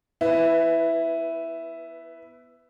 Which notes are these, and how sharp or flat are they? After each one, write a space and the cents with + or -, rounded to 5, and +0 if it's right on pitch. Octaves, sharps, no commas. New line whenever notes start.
B3 -5 E4 +0 B4 +20